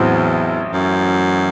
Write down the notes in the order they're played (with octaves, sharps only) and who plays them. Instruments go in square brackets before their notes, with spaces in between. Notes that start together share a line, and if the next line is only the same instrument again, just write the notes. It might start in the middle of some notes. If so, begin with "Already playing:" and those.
Already playing: [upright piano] A1 A2 F#3 C4 [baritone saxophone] E2
[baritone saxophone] F#2